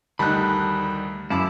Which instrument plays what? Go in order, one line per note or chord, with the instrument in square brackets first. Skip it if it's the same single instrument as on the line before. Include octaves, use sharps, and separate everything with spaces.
[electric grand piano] D2 D#3 G3 [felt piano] D#4 A5 [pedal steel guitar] B5 F#6
[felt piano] F#2 [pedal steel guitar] E4 [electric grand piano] F5 A5 D6